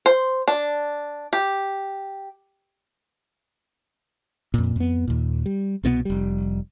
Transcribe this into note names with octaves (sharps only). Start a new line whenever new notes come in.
C5
D4
G4
F2 A#2
F2 B3
D#2 A#2
G3
C2 B2 D3 B3
F1 G3